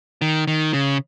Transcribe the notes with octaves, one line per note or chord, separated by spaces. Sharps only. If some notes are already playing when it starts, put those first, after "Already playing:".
D#3
D#3
C#3